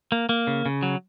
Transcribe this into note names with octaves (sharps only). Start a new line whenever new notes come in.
A#3
A#3
C#3
C#3
F#3